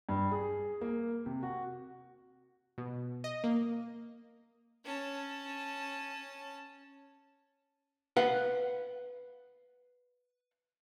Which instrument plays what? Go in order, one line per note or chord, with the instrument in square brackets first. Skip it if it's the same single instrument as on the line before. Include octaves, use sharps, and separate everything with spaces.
[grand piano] G2
G#4
A#3
C3
F#4
[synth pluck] B2
D#5
A#3
[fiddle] C#4 A5
[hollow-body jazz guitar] B4 F5 F#5